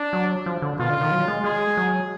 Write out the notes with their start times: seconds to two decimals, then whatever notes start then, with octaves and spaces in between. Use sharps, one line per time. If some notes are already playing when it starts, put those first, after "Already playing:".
Already playing: D4
0.13 F#3
0.46 F3
0.62 D3
0.80 B2 F4
0.90 D3
1.01 D#3
1.11 F#3
1.28 G#3
1.44 G#3 G#4
1.77 F#3